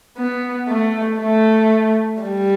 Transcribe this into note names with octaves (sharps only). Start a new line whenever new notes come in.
B3
A3
A3
G3